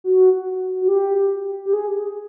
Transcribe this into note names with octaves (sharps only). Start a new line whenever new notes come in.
F#4
F#4
G4
G4
G#4